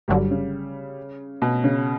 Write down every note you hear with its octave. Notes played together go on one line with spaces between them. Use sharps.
G1 G2 D3 F#3 G3
C#3
B2
C#3